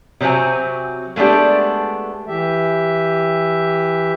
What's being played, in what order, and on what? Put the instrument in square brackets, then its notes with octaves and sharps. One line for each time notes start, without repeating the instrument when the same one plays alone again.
[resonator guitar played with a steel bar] C3 F#3 C4 F#4 G#5
G#3 A3 B3 D4 G4
[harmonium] E3 G4 E5